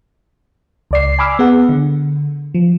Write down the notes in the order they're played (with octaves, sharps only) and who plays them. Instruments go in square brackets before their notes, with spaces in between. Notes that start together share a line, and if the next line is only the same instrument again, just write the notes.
[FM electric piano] C#2 D5 C7
G#5 B5 D6 E6 F6
B3 G#4 F#5
D3
F3